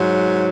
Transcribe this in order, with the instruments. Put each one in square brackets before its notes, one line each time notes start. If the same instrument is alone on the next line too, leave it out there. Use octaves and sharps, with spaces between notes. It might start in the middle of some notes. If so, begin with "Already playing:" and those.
Already playing: [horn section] G#2 F#3